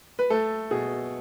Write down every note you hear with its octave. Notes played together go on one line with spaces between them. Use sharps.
B4
A3 A4
B2 G#4